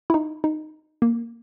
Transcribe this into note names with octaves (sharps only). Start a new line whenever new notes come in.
E4
D#4
D#4
A#3